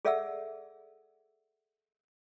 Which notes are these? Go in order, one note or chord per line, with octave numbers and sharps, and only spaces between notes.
G#4 A4 D5 E5 F#5 E6